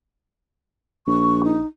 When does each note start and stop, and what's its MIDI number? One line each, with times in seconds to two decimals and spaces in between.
1.07 1.58 34
1.07 1.42 85
1.44 1.66 63